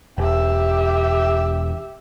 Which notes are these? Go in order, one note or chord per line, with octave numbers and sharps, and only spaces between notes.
E1 G4 E5